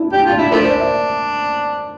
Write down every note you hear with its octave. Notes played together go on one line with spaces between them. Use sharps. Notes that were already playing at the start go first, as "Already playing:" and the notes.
Already playing: D4 E4
D4 G4
F4
D4
E4
F3 A3 D4 A#4
C5
D5
E5